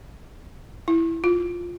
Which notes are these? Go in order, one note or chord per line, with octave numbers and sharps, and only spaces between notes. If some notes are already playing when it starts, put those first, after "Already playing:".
E4
F4